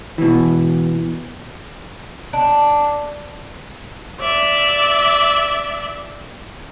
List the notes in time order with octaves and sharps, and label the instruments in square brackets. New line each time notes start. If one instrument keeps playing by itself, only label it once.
[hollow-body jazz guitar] B2 E3
[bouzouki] D4
[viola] D5 E5